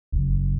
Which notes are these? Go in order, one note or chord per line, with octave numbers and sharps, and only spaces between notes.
F#1